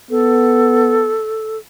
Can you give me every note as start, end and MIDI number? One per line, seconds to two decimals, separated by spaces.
0.11 1.18 59
0.11 1.58 69